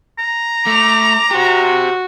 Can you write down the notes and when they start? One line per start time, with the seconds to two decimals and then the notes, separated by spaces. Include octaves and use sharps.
0.18 A#5
0.67 A3 D6 F7
1.31 F#4 G4 C5